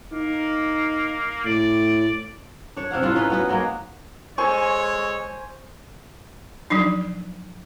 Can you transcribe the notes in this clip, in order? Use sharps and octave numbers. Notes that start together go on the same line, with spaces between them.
A#3 D#4
A2 D5
D4 C#5
C3 D4 F5 F#5
A2 D4 F4 A4
C#4 D#4 B4 F5
B3 C#4 F#4
F#3 G#3 A#3 B3
G#3 A4 C5 C#5 G#5 C#6
F3 F#3 D4 D#4